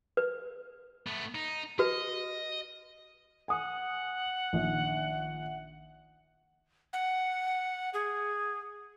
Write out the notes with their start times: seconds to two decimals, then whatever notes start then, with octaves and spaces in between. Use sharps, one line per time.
0.17 B4
1.07 A3 B3
1.35 D#4
1.79 F#4 B4 D#5
3.48 F#5 G#5 D#6
4.53 A#1 D#3
6.93 F#5
7.94 G#4